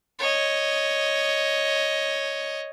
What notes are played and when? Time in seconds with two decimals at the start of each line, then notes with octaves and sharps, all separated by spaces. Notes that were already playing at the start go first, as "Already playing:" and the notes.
0.19 C#5 D#5